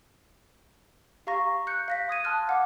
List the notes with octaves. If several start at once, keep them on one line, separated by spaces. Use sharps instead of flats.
G4 F5 A#5 C#6 A#6
F#6 G6 C#7
F5 A#6 B6
C6 D#6 G#6 D#7
A5 C6 F6 F#6 A6
F5 F#5 D6